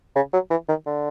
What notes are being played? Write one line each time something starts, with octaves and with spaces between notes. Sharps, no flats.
C#3
F#3
E3
D#3
D3